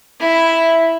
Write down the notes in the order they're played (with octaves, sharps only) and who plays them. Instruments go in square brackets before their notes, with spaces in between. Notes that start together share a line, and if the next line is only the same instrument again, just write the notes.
[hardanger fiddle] E4 E5